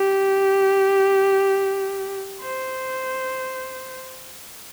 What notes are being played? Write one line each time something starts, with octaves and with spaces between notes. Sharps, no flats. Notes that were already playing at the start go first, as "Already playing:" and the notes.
Already playing: G4
C5